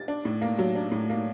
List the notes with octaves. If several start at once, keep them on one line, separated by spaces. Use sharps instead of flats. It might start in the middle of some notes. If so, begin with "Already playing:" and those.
Already playing: A6
D4
A2
A#3
F#3
D4
A2
A#3